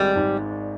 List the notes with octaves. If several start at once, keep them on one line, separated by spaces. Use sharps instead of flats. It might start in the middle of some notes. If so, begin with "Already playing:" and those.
Already playing: G#1 G3 G#3
G#2